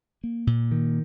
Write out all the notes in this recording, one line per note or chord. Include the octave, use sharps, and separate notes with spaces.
A#3
A#2
D#3